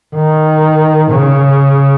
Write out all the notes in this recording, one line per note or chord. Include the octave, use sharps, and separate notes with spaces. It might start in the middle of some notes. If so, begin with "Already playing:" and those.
D#3
C#3